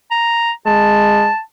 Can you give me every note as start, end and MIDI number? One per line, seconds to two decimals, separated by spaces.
0.11 0.51 82
0.66 1.30 56
0.66 1.39 81